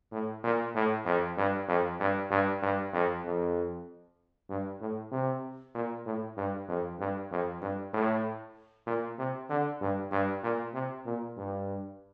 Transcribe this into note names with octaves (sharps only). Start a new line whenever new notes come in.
A2
A#2
A2
F2
G2
F2
G2
G2
G2
F2
F2
G2
A2
C3
A#2
A2
G2
F2
G2
F2
G2
A2
A#2
C3
D3
G2
G2
A#2
C3
A#2
G2